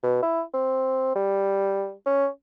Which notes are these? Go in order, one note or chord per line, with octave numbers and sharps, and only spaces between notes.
B2
E4
C4
G3
C#4